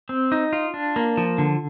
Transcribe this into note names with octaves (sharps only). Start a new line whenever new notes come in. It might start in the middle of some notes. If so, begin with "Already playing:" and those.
C4
D#4
F4
D4
A#3
F3
D3